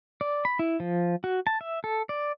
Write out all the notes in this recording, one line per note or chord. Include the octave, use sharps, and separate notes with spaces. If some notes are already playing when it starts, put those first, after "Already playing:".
D5
B5
E4
F3
F#4
A5
E5
A4
D5